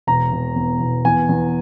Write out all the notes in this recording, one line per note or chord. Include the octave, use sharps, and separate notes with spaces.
E1 A#5
E1
E2
E1
E2 G#5
E2